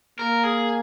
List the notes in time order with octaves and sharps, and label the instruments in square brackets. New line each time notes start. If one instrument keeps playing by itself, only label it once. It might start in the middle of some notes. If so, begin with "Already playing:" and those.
[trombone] A#3 [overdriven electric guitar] A#4
[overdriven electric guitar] G#4